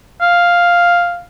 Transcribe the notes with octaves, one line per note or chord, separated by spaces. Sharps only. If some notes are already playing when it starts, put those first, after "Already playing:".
F5